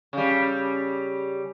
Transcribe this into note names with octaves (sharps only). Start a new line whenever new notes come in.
C#3 G3